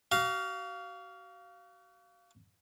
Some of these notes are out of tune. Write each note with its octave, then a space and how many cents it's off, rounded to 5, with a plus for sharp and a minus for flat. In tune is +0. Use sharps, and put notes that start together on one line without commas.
F#4 +40 F5 +0